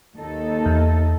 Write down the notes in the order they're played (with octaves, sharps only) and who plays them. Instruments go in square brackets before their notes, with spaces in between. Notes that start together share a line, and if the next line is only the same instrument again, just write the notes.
[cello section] D#2 D#4 A4
[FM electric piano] E2